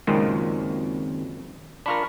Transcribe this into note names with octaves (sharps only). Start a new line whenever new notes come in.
C#2 F#2 A#2 D#3 G#3 C4
D4 F4 A#4 B5 C#6 F6